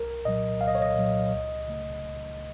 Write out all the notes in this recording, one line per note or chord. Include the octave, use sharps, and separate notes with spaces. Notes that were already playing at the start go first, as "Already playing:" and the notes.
Already playing: C2 A#4
A#2 F#3 D#5
C2 F5
D#5
C#5
D#5
A#2 F#3
C#2
C#3 A3